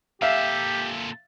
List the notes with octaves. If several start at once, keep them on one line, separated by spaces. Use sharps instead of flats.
A#2 G4 A4 E5 F5